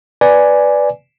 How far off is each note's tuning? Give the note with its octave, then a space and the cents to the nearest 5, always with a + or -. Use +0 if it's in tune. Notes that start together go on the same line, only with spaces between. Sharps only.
B4 +0 D5 +0 G#5 +0